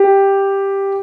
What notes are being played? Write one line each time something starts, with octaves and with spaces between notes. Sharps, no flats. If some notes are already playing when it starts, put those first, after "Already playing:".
Already playing: G4